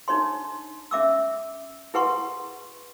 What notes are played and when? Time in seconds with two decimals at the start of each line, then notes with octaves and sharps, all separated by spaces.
0.08 D4 D#4 C#5 C6
0.91 C#4 E5 D6 E6
1.94 E4 G#4 B4 F#5 C6 C#6